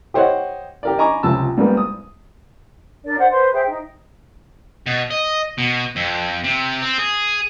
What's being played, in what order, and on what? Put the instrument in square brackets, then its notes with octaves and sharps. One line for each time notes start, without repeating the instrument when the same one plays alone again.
[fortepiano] G4 C5 C#5 D#5 F#5
G4 A#4 D5
D#5 G#5 A#5 B5 C#6 D6
C#2 C3 F3 A5 E6
G#2 G3 A#3 B3
D#6
[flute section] D4 A#4 D5
C5 D5 F#5
B4 C5 C6
G#4 C5 E5 G5
D#4
[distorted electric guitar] B2
D#5
B2
F2
C3
C4
G#4